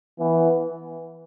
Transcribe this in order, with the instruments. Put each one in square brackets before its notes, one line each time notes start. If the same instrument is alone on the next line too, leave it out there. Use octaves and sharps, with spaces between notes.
[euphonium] E3 [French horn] B3